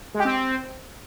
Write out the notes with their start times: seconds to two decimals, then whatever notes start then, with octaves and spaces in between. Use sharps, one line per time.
0.14 G#3
0.20 G4
0.25 C4